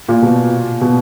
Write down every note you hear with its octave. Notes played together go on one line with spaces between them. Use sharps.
A#2
B2
B2